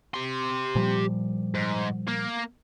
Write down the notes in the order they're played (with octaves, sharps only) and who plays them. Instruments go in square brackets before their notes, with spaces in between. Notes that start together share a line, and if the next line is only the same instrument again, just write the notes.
[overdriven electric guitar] G4 C6
[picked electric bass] A#2 F3 G3
[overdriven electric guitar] G#2
A#3